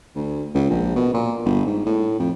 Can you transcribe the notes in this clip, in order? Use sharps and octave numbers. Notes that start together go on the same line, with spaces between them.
D2
C#2
A#1
B2
A#2
G1
G#2
A2
F2